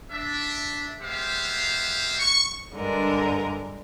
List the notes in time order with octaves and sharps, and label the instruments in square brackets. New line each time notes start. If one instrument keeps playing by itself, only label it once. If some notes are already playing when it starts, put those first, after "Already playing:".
[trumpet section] D4 E5
G#3 B3 G4 C5 E5 F5
C#6
[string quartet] G2 D3 G#3 A#4